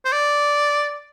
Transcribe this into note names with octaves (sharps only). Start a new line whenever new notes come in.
C5
D5